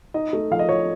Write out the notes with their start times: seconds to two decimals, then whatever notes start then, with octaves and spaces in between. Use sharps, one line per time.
0.14 D#4 D#5
0.33 A3
0.51 F3 F5
0.59 D#5
0.69 F3 C#5